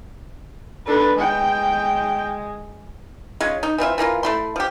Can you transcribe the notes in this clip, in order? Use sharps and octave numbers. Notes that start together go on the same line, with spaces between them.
D4 A4 B4
G#3 G5
G#3 C#4 F4
D#4
E3 C4 F4 E5
E3 A#3 D#4 F4
A3 E4 C6
F3 G4